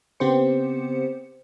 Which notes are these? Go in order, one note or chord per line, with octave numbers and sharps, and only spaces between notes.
C#3 B3 C4 G4 C5 C#7